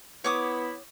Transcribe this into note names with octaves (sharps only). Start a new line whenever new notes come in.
B3 E4 C#5 D6 D#6